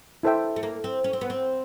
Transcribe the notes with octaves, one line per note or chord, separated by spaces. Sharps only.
E4 A4 C5 E5 G5
A3
A#3
C4
C#4
C4
B3
C4